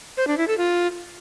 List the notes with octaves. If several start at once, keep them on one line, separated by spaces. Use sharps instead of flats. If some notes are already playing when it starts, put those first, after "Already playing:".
C5
D4
E4
A4
F4